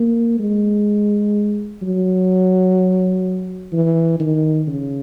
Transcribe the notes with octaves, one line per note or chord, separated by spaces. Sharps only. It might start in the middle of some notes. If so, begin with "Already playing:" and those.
Already playing: A#3
G#3
F#3
E3
D#3
C#3